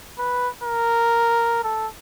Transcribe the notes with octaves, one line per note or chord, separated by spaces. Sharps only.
B4
A#4
A4